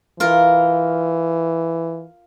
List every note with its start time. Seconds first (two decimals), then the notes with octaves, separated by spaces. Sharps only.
0.20 E3 F4 A#4